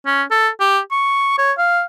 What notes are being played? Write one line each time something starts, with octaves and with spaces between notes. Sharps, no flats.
C#4
A4
G4
C#6
C#5
F5